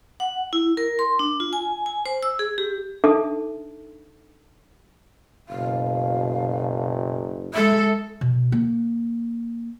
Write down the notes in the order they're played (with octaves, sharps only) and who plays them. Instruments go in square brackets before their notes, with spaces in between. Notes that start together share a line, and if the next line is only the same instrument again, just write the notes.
[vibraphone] F#5
E4
A#4
C6
D4
F4
G#5
G#5
C5
E6
G#4
G4
[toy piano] D4 D#4 A4 E5 A5 D6
[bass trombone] F#1 [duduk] B2 [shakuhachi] F5
[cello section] G#3 A4 [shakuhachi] E5
[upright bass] B2
A#3